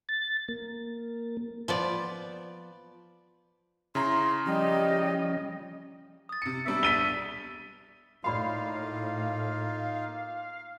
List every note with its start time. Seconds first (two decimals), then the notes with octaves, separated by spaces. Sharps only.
0.09 A6
0.49 A#3
1.68 F3 B3 D5
3.95 C#3 E4 A#5 C6
4.46 F3 G3 C#4 G4 D#5
6.29 D#6 A6
6.42 C3 C#7
6.66 B2 G3 D4 E5
6.83 A6 B6 D#7 G7
8.24 A2 A#3 D#4 F4 D5 F5 B5 C6